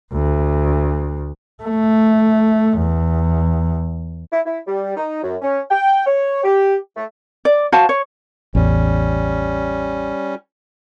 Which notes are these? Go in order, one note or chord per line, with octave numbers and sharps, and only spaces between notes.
D2
A3
E2
E4
E4
G3
D#4
F#2
C#4
G5
C#5
G4
A3
D5
F#4 C5 F5 A5
C#5
A1 E2 G3 C#4